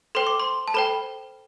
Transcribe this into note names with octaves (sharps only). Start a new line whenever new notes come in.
A4 C5 G5 C6
D6
C6
A5
A4 C5 G5 B5